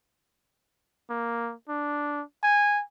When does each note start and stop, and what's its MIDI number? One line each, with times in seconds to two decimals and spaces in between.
1.10 1.54 58
1.69 2.23 62
2.43 2.83 80